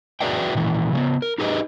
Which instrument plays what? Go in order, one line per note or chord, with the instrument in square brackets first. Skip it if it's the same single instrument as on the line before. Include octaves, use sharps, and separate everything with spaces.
[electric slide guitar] F#4 G#4 B4 D5 E5 G5
A#2 D#3 E3
C#3 A#3 B3
A#4
D#4 G4 G#4 B4 D#5